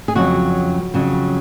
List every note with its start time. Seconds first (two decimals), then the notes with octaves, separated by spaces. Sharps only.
0.08 G#4
0.15 F2 C#3 F#3 F#4
0.94 F2 C#3 F#3